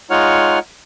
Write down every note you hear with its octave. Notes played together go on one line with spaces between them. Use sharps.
G#3 D#4 F4 C#5 F#5 F6